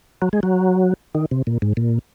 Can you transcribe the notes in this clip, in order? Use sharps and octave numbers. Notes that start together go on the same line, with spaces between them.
F#3
G#3
F#3
D#3
C3
A#2
G#2
A#2